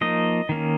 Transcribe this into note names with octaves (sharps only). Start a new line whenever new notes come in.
F3 A#3 D#4 D#5
D#3 A#3 C#4